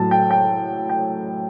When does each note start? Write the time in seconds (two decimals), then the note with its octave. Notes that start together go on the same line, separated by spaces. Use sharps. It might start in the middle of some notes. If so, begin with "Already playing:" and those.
Already playing: A2 F#3 A5
0.11 G5
0.31 G5
0.89 G5